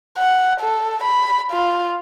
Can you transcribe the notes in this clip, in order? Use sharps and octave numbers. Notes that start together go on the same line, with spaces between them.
F#5
A4
B5
F4